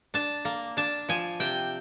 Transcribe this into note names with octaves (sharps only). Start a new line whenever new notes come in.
D4 A5
A#3
D4 A5
F3 G#5
C3 G5